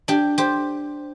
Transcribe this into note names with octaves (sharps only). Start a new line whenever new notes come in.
D4 G4
G4 C5